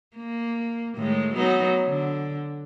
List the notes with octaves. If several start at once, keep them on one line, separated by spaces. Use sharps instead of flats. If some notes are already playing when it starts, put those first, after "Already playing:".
A#3
A2 D#3 G#3
F#3 B3 D#4
D3